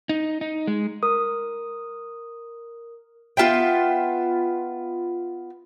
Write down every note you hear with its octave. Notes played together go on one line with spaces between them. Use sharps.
D#4
D#4
G#3
A#4 D#6
B3 F4 E5 G5